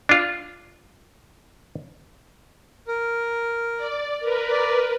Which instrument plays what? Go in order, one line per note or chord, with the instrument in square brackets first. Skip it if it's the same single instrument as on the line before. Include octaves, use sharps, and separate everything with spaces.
[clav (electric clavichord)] D4 F4
[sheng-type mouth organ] A#4
[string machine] D5
A#4 B4
[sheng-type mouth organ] D5